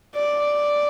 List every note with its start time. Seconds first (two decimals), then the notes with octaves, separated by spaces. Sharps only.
0.15 D5